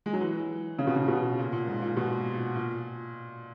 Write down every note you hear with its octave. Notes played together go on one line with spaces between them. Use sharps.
G#3
F#3
E3
C#3
B2
C#3
B2
A#2
A#2
G#2
A#2
B2
A#2